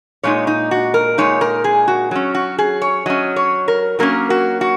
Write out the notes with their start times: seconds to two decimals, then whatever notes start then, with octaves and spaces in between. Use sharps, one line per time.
0.23 A#2 G#3 D#4 C#5
0.47 D#4
0.71 F#4
0.94 A#4
1.18 A#2 G#3 D#4 C#5
1.41 A#4
1.64 G#4
1.88 F#4
2.11 F#3 C#4
2.34 F#4
2.58 G#4
2.82 C#5
3.06 F#3 C#4 D#5
3.36 C#5
3.68 A#4
3.99 F#3 A#3 C#4 A#4
4.30 F#4
4.61 F#4